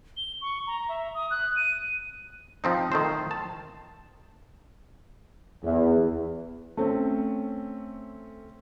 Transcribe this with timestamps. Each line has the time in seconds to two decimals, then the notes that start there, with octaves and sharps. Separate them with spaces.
0.17 G7
0.41 C#6
0.67 A#5
0.89 E5
1.14 D#6
1.31 F#6
1.56 D#7
2.64 F3 C4 D#4
2.92 D#3 A3 C5
3.31 A5
5.64 E2
6.77 A3 C4 C#4